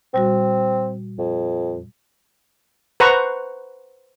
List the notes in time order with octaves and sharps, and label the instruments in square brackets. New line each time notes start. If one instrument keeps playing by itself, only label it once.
[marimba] A#2 G3 F#4 [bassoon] C4
[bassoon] F2
[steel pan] B4 C5 F#5 A#5 C#6